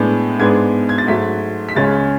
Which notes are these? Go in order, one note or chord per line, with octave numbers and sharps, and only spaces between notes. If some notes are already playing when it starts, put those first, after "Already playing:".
Already playing: A2 G#3 B3 D4
G#2 G#3 B3 D4 G#6
G#6
A6
G#2 F#3 A3 B6
B6
C#2 C#3 G#3 C#4 A6